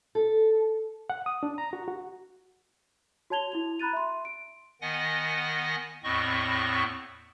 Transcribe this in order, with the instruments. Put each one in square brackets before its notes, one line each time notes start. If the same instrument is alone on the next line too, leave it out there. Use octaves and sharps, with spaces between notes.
[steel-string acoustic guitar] A4
[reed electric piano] F#5
D#6
D4
A#5
F#4
F#4
[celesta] F#4 C#5 A5 G#6 F7 G7
E4 F#4 F7
A#5 B5 F#6 A6 D#7
E5 C6
D7
[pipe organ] D#3 B3 D#5 F#5 G#5 A#6
E2 A2 B3 C4 D#5 C#6